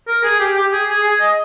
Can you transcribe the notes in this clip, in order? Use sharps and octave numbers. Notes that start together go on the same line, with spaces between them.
A#4
G#4
G4
G4
G#4
G#4
G#4
D#5